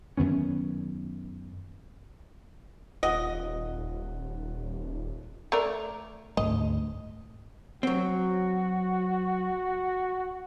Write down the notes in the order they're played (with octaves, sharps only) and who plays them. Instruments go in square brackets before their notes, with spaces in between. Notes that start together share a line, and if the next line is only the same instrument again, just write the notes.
[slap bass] F#2 D#3 B3 C#4
[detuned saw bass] D#1 [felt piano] F4 F#5 [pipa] D#5
[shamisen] A3 A#4 D5
[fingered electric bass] D2 G#2 A3 [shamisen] D#5
[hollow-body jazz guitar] F#3 C4 [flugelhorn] F#4